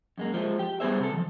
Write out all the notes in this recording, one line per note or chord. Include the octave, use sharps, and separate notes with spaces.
F#2 G#3 A#3
F3 G#3 A3
G4
G3 B3 D4 G#4 C5 E5
C3 A4
D#3 F3